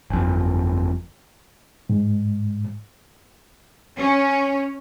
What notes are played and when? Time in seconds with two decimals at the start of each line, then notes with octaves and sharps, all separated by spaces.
0.10 G1 F2
1.89 G#2
3.98 C#4